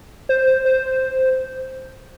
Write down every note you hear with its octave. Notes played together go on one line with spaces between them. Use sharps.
C5
C5